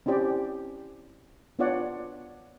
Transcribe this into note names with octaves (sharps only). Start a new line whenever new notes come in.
C4 C#4 E4 G4 D5
B3 D4 F4 C#5 D5 F#5